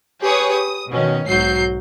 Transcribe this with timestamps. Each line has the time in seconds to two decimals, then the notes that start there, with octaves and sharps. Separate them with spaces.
0.22 G4 G#4 B4 C#5 C#6 D#6
0.50 D#6
0.91 B2 D#3 C#4
1.26 B1 G#2 F#3 G6 C7